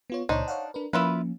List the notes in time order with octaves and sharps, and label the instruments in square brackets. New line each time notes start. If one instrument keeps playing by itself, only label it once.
[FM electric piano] B3 F4 C#5
[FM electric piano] C#2 A#2 C#5 [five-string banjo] D4 D#4 C5
[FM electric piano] C#5 F5 F#5
D4 A#4 B4
[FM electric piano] F3 A#3 C#4 [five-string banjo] E4 F4 B4